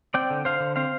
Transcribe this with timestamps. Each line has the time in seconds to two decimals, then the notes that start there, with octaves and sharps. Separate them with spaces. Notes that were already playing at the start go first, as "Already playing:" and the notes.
0.14 C4 D5 G5
0.30 D3
0.45 D3 C5 F5
0.60 D3
0.76 C4 C5 F5